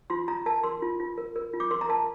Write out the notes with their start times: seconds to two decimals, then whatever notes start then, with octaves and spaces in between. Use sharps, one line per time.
0.10 F4 C6
0.28 F4 A#5
0.46 A#4 A5
0.64 A#4 C6
0.82 F4
1.00 F4
1.18 A#4
1.36 A#4
1.54 F4
1.60 D6
1.71 A#4 C6
1.81 A#5
1.89 A#4 A5